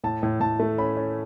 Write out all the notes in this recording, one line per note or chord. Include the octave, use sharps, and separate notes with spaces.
A2 A5
A2
A2 A5
A3
C#4 B5
C#4